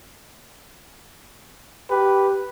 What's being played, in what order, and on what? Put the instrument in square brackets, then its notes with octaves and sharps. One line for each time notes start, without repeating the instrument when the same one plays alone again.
[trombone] G4 [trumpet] B4